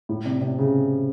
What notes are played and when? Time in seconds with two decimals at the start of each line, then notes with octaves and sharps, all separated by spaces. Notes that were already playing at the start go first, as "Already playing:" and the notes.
0.09 A2
0.25 C3
0.41 C3
0.59 C#3